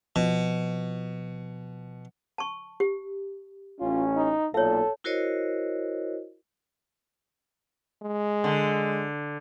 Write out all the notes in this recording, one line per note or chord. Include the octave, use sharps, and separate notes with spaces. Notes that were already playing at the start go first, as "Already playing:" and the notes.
B2 F3
A5 C#6
G4
A1 C#4 F4
D#4
B1 A#2 A4 C#5 E5
E4 F#4 A#4 C5 C#5 D#5
G#3
D3